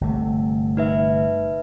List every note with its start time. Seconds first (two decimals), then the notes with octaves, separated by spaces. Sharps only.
0.01 G1 C3 A3
0.77 D#4 B4 E5